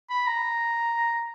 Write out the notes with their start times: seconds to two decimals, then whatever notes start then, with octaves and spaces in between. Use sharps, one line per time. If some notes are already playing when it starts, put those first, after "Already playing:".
0.10 B5
0.27 A#5